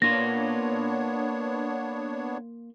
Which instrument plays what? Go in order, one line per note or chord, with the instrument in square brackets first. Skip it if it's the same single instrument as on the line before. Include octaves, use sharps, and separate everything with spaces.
[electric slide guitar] A#3 F4 [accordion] B3 D4 C#5 [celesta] A#6